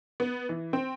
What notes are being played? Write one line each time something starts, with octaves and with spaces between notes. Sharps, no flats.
B3
E3
C4